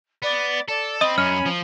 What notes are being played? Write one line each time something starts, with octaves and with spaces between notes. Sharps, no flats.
B3 D5
A4 D5
C4 D#5 B5 D#6 D#7
F#2 C#4 F6
F3